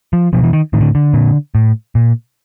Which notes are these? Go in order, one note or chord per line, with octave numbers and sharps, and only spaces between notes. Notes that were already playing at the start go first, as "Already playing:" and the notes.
F3
B2 F3
E3
D#3
A2 D#3
D3
D3
A#2
A2
A#2